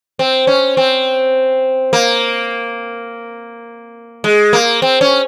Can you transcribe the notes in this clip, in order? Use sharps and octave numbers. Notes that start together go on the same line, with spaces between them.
C4
C#4
C4
A#3
G#3
A#3
C4
C#4